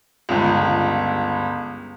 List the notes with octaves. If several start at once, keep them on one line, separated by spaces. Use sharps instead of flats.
G1 C#2